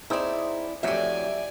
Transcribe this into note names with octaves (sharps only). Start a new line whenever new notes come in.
C4 D#4 E4 G#4 D5
F2 A2 F#3 G4 D5 E5 G#5